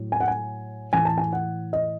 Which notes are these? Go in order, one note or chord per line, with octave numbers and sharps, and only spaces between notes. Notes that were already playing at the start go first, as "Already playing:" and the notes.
Already playing: A2 F#3
G#5
F#5
G#5
A2 E3 G#5
A5
G#5
F#5
D#5